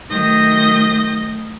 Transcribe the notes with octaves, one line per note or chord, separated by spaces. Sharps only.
D#3 F#3 A3 D#6 G6 A#6